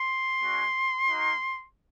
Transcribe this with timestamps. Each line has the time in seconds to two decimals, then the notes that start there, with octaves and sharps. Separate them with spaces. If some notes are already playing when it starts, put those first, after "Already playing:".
Already playing: C6
0.42 G#3 C#4 F#4
1.10 A#3 D#4 F#4